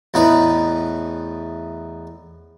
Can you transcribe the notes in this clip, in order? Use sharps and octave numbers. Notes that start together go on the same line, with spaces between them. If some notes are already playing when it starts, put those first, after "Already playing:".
E2 A2 D#4 B4